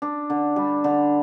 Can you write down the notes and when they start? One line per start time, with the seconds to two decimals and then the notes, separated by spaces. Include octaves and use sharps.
0.02 D4
0.30 D3
0.56 G3
0.84 D3